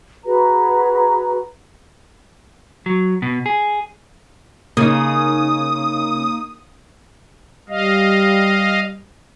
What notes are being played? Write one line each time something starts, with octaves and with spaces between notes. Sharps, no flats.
F#4 G#4 B4 A#5
F#3
B2
G#4
C#3 A#3 D#4 D#6
G3 D#5 F5